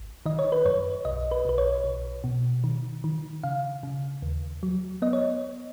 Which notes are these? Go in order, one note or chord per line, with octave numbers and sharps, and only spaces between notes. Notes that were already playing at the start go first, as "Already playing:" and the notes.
Already playing: G#1
D#3 D#5
C#5
B4
F#2 C#5
B1 D#5
B4
B1 B4
C#5
B1
B2
D#3
D#3
C#3 F5
C#3
D#2
F#3
B3 D#5
C#5